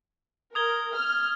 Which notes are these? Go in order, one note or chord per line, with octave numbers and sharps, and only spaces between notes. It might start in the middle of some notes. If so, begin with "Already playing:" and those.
A#4 D#6 G#6 G7
F6